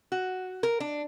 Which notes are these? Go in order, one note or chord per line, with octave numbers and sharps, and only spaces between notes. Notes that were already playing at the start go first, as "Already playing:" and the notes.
F#4
A#4
D4